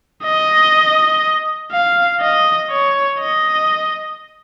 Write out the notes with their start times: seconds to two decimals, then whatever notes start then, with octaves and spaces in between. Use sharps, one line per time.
0.24 D#5
1.72 F5
2.21 D#5
2.71 C#5
3.20 D#5